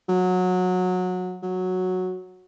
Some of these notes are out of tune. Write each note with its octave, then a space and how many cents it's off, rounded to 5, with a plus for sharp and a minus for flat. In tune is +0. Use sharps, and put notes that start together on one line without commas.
F#3 -20
F#3 -10